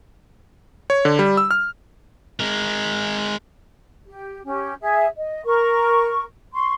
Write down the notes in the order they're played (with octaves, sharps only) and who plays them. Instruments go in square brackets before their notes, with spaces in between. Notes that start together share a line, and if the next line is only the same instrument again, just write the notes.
[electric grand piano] C#5
D3
G3
E6
F6
[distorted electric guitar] G#3 A#4
[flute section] G4
C#4 G4
G#4 E5
D#5
A#4 C#6
C6 C#6